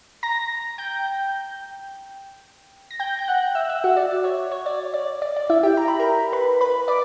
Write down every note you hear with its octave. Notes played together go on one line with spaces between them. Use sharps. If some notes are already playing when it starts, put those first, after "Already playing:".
A#5 A#6
G5 G6
A#6
G5 G6
G6
F#5 F#6
E5 E6
E5 E6
F#4 F#5
D5
D5
C#5
C#5
D5
D5
D5
D5
E4 E5
G4 G5
A#5
B5
A#4 A#5
B4 B5
B4 B5
D5 D6